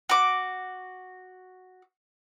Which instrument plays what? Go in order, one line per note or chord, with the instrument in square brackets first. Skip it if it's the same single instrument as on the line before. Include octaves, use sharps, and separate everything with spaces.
[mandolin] F#4 D6